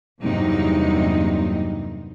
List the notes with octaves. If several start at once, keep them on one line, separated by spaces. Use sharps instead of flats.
E2 G2 C3 F#3 A#3 D#4